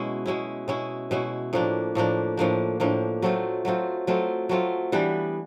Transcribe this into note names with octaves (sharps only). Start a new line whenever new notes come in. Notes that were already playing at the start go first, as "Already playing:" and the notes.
Already playing: B2 G#3 C#4 E4
B2 G#3 C#4 E4
B2 G#3 C#4 E4
B2 G#3 C#4 E4
A2 F3 A#3 D4
A2 F3 A#3 D4
A2 F3 A#3 D4
A2 F3 A#3 D4
F#3 A3 C4 F4
F#3 A3 C4 F4
F#3 A3 C4 F4
F#3 A3 C4 F4
E3 G3 B3 D4